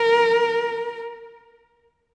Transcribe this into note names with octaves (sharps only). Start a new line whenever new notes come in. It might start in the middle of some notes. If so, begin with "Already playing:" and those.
Already playing: A#4